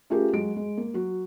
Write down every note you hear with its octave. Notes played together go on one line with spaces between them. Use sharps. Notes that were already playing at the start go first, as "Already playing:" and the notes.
A3 C#4 F4 G4 G#4 A#4
F#3 G#3 F#4 D7
G#3
A#3
F#3 F#4